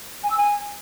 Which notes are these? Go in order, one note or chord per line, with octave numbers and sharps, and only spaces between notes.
G#5
E6
G#5